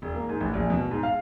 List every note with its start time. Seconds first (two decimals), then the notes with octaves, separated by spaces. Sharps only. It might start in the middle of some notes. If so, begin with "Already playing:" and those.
0.02 E1
0.14 A#3
0.29 G#2
0.40 A1
0.54 A#1
0.70 B2
0.91 G#2
1.03 F5